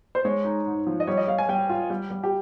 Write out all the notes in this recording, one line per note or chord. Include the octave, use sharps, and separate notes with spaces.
C5
G#3 C#5
D#4
G#2
F3
D#5
G3 C#5
D#5
G3 F5
G#5
G3 G5
F4
G3
G3
G4